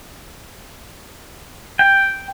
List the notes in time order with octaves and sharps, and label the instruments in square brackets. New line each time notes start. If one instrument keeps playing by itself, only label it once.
[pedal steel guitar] G5